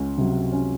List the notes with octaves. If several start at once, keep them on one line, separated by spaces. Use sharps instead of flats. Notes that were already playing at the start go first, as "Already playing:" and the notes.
Already playing: C#2 C#4
C3 F#3
C#4